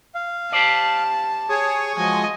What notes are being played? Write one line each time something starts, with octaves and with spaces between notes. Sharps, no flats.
F5
G4 C5 D5 A5
G#4 C#5 C#6 D#6
F3 F#3 G#3 D#5 G#5